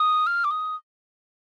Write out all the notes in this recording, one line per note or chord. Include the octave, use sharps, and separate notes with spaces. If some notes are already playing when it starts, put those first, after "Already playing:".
Already playing: D#6
F6
D6
D#6